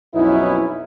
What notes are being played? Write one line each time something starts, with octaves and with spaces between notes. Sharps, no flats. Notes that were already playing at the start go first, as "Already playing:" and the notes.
B1 F2 B3 C#4 D#4 E4